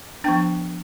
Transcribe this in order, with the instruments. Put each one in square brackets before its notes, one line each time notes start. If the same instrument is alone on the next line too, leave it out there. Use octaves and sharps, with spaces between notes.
[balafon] F3 B3 D4 G5